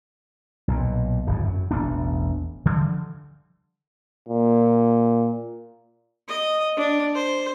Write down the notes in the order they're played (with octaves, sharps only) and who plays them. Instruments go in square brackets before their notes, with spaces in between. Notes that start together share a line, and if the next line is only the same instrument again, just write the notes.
[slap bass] B1 A#2
D1 G#1 G2
F#2
E1 A1 B3 D4
D3 E3 F3 G3
[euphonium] A#2
[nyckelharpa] D#5
D4
C5